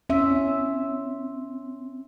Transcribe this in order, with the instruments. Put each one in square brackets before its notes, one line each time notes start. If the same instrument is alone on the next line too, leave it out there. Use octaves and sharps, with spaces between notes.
[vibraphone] C4 [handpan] C#4 E5